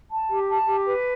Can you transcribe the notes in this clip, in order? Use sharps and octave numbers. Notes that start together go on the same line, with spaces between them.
A5
G4
A5
G4
B4